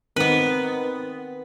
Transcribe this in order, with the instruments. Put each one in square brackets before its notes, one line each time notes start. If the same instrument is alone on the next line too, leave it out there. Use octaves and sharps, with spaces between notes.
[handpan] D#3 C4 D#4 [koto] B3 B4